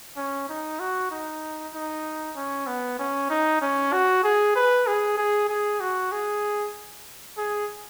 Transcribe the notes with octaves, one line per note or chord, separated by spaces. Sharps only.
C#4
D#4
F#4
D#4
D#4
C#4
B3
C#4
D#4
C#4
F#4
G#4
B4
G#4
G#4
G#4
F#4
G#4
G#4